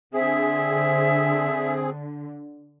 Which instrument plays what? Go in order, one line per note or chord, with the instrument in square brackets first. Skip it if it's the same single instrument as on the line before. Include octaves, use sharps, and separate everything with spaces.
[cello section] D3 [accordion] C4 G#4 [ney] E5